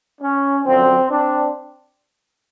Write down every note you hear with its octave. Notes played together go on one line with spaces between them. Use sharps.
C#4
F#2 D3 F3 C4
C4 D4